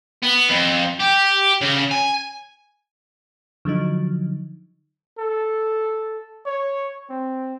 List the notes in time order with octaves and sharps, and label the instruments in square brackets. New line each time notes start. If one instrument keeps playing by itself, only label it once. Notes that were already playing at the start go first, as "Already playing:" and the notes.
[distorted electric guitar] B3
F2
G4
C#3
G#5
[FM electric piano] D3 F3 F#3 D#4
[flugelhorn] A4
C#5
C4